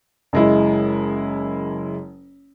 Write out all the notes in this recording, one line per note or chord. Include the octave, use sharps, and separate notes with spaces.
F#1 G#3 E4